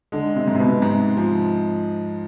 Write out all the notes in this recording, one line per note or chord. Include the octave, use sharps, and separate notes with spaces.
D3 G#3
C3
G#2
C3
B2
G#2 C3
F3